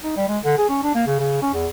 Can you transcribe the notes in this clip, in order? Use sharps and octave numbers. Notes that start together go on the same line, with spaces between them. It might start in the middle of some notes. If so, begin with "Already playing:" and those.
D#4
G3
G#3
D3
G#4
C#4
D4
A#3
C#3
C#3
C#4
E2